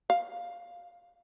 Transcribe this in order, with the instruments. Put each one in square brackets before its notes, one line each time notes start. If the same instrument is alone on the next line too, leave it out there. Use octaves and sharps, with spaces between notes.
[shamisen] F5